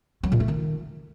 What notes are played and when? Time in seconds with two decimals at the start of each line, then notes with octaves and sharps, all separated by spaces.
0.23 F#3
0.32 A#2
0.40 A3
0.48 D#3